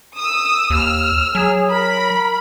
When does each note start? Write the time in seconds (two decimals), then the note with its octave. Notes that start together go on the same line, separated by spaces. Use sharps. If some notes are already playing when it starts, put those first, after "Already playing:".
0.16 D#6 E6
0.70 D#2 E6 F6
1.35 F#3 G#4
1.71 A#4 B5